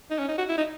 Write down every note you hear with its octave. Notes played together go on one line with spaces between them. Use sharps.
D#4
C#4
D#4
F#4
E4
D#4